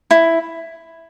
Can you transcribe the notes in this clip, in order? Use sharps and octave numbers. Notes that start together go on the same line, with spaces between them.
E4